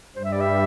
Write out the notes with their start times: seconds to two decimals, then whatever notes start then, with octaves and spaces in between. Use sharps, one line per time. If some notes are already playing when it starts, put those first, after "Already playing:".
0.16 G2 G3 C5
0.24 E5
0.32 D5
0.41 E5